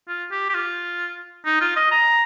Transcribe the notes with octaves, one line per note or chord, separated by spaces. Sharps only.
F4
G4
G4
F4
D#4
F4
D#5
A#5